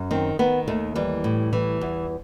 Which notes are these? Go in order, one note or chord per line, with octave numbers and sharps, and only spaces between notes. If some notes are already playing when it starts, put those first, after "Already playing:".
Already playing: F#2
D#3 C4
D#3 B3
D#2 A3
E3 G3
A2
E3
E2